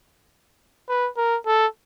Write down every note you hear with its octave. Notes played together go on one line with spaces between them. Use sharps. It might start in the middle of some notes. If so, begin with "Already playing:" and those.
B4
A#4
A4